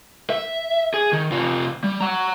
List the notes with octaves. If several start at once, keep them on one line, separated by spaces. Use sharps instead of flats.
E5
G#4
D#3
C3 F4
G3
F#5 A#5